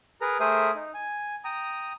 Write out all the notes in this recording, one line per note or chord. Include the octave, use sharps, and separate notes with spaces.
G#4 A#4 B4 A#5
A3 G#4 A#4 C5 E5 D#6
D#4
G#5
G5 A#5 D#6